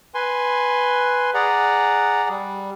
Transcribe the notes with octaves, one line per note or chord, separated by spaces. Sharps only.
B4 G#5 C6
G#4 D5 F#5 A#5
G3